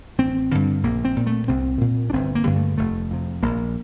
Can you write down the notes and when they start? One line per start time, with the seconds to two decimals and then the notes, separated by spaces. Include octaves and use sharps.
0.18 A1 C4
0.51 G2 D3
0.83 A#1 A#3
1.05 C4
1.16 A#2
1.27 A3
1.48 C2 C4
1.81 A#2
2.10 D4
2.13 G1 C4
2.35 A#3
2.45 G2 D3
2.56 A3
2.78 F1 A3
3.11 F2 C3
3.42 A#1 A#3